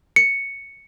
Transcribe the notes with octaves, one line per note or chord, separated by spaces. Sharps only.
C#7